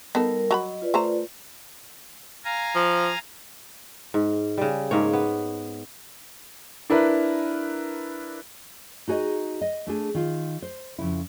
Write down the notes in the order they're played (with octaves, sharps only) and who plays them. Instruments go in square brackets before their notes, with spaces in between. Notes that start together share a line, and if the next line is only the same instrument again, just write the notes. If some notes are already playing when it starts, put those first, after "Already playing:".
[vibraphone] G3 A#4 [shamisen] B3 D#4 A4
[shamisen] F#3 A#5 B5 [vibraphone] D#5
[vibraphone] F4 B4 D5
[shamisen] A3 C5 A#5
[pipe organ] F5 G#5 A#5
[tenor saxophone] F3
[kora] G#2
C#3 G3
G#2 A#3 C#5
B3
[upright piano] D4 E4 A#4 B4
[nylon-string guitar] D#4 F#4 G#4 C#5 D#5
D#5
A3 D4 G#4
D#3 F4
C5
F2 C#3 E4